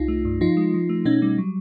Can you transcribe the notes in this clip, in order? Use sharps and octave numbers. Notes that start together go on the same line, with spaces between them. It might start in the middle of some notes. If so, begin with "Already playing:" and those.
Already playing: C2 D#4 F4
A3
G2
F3 D#4 F4
G#3
F3
A3
B2 C#4 D#4
G3 C#4
F#3